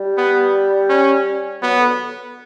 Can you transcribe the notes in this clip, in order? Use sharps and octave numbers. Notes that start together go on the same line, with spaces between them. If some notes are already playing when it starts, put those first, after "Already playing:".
Already playing: G3
B3
C#4
F#3 B3
D3